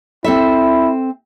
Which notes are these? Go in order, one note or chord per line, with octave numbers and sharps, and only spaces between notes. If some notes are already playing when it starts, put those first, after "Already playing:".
C4 E4 A4 E5